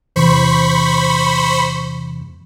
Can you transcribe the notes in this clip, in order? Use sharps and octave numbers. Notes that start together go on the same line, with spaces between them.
E2 C3 E3 C5 B5 C#6